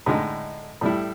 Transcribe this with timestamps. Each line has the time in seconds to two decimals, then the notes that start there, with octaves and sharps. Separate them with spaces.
0.06 A2 D3 G#3 D#4
0.81 A2 G3 E4